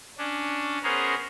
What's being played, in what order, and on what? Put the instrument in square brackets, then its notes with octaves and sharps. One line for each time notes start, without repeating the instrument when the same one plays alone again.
[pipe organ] C#4 D4
B3 C#4 G#4 A#4 C5 A#5